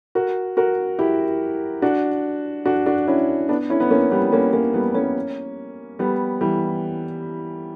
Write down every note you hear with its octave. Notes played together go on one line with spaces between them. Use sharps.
F#4 A#4
F#4 A#4
E4 G4
D4 F#4
D4 F#4
D4 F#4
C#4 E4
B3 D4
C#4 E4
B3
A#3 C#4
G3 B3
A#3 C#4
A#3 C#4
G3 B3
A#3 C#4
G3 B3
E3 G3